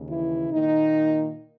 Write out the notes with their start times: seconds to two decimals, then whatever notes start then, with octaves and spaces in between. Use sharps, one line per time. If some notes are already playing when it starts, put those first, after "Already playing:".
Already playing: D#2 C#3
0.08 E3 E4
0.52 A#2 D#3 A#3 D#4